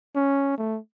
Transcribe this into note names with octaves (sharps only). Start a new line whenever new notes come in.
C#4
A3